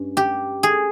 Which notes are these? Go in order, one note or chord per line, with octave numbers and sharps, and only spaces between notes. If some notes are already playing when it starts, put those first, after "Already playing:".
Already playing: G2 C#4
G4
G#4